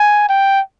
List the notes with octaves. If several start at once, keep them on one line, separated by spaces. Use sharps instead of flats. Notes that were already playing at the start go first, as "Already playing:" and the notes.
Already playing: G#5
G5